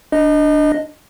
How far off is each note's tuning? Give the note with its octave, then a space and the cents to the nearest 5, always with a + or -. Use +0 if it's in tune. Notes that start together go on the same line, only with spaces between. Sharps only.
D4 +0 D#5 +0